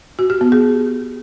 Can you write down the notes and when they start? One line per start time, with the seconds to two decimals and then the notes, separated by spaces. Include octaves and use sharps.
0.19 F#4
0.30 G4
0.41 B3
0.52 G#4